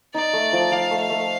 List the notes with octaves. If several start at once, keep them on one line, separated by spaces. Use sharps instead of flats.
D#4 D5
A3
F3
F3 F5
A3
F5
A3